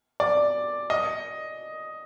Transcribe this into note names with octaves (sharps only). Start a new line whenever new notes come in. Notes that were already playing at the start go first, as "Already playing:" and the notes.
D5
D#5